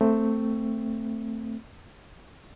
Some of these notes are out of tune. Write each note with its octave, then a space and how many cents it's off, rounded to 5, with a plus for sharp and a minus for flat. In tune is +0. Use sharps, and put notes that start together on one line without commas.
A3 +15 C4 +0